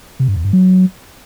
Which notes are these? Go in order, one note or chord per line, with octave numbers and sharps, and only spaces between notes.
C3
G2
E2
G2
F#3